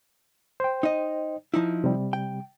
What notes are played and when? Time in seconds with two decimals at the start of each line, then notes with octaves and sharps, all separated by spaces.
0.60 C5 G5
0.83 D#4 D#5
1.54 F3 D#4 E4
1.84 C3 G3
2.13 G5